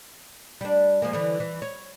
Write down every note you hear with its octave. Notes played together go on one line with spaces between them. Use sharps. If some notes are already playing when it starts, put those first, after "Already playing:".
G3 D4
F3 G#3 A#3
D3 E3
E3
C#5